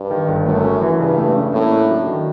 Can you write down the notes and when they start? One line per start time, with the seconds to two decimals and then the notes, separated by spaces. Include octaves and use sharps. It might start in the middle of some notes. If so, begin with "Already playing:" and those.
Already playing: G2
0.11 D#3
0.28 G1
0.46 F#2 A3
0.64 C#4
0.82 E3
1.00 G2 C#3
1.18 A3
1.35 C#4
1.53 A2 A#3
1.71 D4
1.89 F#3
2.07 D#3